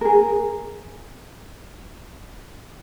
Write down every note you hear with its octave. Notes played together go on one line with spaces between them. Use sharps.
G#4 A#4